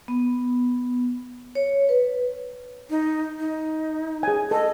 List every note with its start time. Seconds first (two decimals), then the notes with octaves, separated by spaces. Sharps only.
0.08 B3
1.55 C#5
1.89 B4
2.90 D#4
3.39 D#4
4.23 G#4 G#5
4.51 A4 D#5